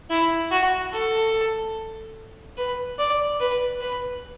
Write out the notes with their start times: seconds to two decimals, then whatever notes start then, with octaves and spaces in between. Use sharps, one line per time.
0.10 E4
0.51 F#4
0.93 A4
2.57 B4
2.99 D5
3.40 B4
3.81 B4